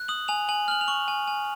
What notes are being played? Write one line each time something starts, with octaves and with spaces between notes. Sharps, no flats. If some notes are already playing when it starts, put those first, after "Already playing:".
Already playing: F#6
D#6 F#7
G#5 F7
G#5 F#7
F6 F#7
F7
C#6 F#7
G#5
G#5